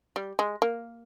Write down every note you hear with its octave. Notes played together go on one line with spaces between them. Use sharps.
G3
G#3
A#3